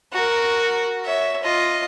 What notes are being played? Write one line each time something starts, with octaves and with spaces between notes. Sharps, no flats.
F#4 A#4
C#5 E5
F4 D#5